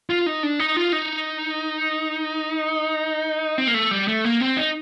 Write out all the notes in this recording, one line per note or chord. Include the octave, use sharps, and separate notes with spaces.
F4
D#4
D4
D#4
F4
D#4
C4
A#3
A3
G3
A3
A#3
C4
D#4